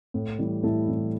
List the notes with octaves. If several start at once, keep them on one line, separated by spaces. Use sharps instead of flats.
A2
E3 G3
A2 E4 A4
E3 G3